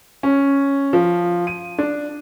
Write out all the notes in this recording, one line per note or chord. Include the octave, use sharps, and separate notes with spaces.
C#4
F3
D#7
D4